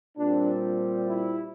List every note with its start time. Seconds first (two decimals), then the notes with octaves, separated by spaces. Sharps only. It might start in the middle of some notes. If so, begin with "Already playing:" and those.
0.17 A#2 G3 C4 D4
1.06 E4